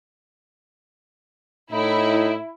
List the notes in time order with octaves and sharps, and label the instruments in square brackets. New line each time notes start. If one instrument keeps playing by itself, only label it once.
[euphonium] A2 [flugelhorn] D#4 [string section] E4